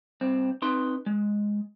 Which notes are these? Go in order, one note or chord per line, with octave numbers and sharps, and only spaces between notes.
G2 C4
C4 D#4 B4 C6
G#3